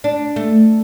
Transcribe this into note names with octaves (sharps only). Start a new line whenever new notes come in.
D4
A3